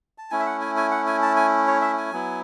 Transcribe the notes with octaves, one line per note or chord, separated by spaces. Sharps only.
A5
A3 C#4 E4 G#5
E5
F#5
G#5
G#5
F#5
G#5
A5
G#5
C#5
E5
G#5
F#3 B3 E4